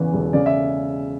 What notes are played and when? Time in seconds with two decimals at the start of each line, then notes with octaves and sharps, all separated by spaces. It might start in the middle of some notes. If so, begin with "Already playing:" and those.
Already playing: E2 C#3 E3 B4
0.14 E1
0.33 C#3 D5
0.46 E5